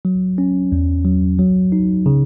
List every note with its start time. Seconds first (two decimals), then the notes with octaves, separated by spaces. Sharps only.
0.05 F#3
0.38 C#4
0.72 E2
1.05 F#3
1.39 F#3
1.72 D#4
2.06 C#3